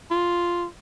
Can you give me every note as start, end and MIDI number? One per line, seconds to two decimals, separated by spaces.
0.11 0.65 65